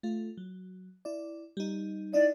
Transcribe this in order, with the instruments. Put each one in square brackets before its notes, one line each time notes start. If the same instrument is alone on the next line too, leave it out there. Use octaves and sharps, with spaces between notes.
[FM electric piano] A3 F4
F#3
E4 D5
G3 D#4
[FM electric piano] D#4 E4 D#5 [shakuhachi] D5